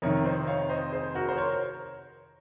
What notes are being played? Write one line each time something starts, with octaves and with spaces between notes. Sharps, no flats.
F2 C3 D#3 A#4 C#5
C5 D#5
C#5 F5
C5 D#5
G#4 C5
F#4 A#4
C5
A#4 C#5